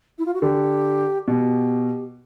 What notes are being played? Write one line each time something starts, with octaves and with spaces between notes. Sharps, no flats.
E4
F4
F#4
D3 G4
B2 G4